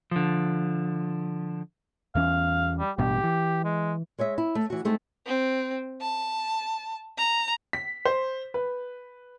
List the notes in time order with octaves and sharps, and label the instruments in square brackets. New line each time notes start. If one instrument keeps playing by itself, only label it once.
[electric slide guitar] D3 F3
[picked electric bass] E2 E3 C#4 [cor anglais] F5
[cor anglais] G3
[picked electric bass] A1 G2 B2 [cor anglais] G4
[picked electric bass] E3
[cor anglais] G#3
[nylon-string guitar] G#3 C#5 D#5 E5
E4
A3
E3 F#4
G#3 A3 C4 D#4 A4
[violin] C4
A5
A#5
[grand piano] B6
C5
B4